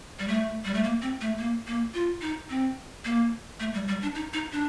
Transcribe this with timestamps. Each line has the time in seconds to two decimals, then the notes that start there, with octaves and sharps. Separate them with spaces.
0.19 G3
0.28 A3
0.65 G3
0.74 A3
0.83 A#3
1.02 C4
1.21 A3
1.38 A#3
1.67 A#3
1.94 F4
2.21 D#4
2.50 C4
3.05 A#3
3.60 A3
3.74 G3
3.88 G3
4.02 D4
4.15 D#4
4.33 D#4
4.53 D4